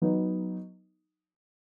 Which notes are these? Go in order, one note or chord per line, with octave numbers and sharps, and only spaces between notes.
F#3 B3 D#4